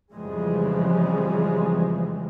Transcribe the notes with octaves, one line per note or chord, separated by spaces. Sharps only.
F2 C#3 E3 F3 G3 G#3